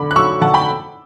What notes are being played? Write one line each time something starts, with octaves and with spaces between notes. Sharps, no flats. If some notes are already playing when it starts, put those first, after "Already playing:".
Already playing: D3 B5 D6
F#6
F#3 C#6 E6
D3 F#5 A5
G5 B5